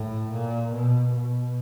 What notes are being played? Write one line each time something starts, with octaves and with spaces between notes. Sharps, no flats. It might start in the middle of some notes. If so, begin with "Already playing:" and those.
Already playing: A2
A#2
B2
B2